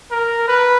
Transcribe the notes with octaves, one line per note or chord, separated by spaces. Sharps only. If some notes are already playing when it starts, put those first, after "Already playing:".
A#4
B4